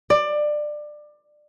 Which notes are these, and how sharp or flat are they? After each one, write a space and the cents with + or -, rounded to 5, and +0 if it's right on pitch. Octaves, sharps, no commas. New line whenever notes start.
D5 +20